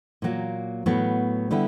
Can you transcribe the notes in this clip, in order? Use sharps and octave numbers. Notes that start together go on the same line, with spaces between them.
A#2 F#3 A#3
A2 F#3 B3
D3 G3 B3 E4